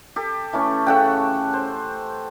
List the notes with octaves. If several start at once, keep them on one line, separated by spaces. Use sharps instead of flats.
G4 A4
E3 A3 C#4
C#3 A4 F#5 G5
C5